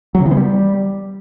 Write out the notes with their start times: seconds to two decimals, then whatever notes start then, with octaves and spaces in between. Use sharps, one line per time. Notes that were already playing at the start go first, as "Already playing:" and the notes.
0.15 F#3
0.20 C#3
0.26 E3
0.31 B3
0.37 G3